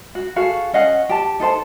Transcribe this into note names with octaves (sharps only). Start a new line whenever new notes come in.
F#4
F#4 G#4 A4 F5
C#4 D#5 F5 F#5
G4 A5
D#4 A4 C5 A5